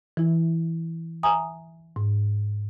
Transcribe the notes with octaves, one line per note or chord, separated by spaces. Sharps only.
E3 E4
E5 G#5 A#5 D#6
G#2